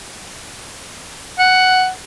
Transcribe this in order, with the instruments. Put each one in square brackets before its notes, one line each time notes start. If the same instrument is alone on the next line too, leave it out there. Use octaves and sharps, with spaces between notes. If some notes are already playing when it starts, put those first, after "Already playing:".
[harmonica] F#5